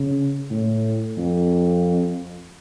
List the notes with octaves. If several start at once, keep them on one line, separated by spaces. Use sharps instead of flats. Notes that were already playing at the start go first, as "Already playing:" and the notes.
Already playing: C#3
A2
F2